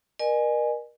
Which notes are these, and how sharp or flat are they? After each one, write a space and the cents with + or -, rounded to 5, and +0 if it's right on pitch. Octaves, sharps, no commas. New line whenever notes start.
A#4 +30 D#5 -45 G#5 +0